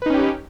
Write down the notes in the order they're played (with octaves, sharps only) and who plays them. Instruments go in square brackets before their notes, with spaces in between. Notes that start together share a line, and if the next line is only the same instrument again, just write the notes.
[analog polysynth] B4
D#4
C#4
G4